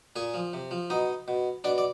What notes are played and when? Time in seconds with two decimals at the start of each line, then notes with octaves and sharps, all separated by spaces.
0.16 A#2 G#4 G#5
0.34 F3
0.53 C3
0.71 F3
0.90 B2 D#4 D#5
1.28 B2
1.64 B2 D4 D5
1.78 D5